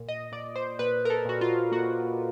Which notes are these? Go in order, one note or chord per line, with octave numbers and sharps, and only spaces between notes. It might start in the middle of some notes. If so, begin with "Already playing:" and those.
Already playing: A#2
D#5
A#2 D5
C5
A#2 B4
A#4
A4
A#2 F#4
F4
A#3 F#4